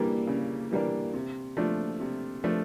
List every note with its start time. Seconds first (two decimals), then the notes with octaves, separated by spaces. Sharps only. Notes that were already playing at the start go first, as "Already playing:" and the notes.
Already playing: E3 G3 A#3 D4
0.27 C#3
0.71 E3 G3 A#3 D4
1.14 C3
1.57 F3 A3 D4
2.00 C3
2.44 F3 A3 D4